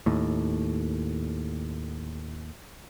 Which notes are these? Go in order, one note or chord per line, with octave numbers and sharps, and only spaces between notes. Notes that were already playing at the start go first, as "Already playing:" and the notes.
D#2 A2